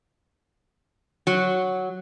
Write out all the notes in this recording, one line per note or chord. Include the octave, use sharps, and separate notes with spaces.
F#3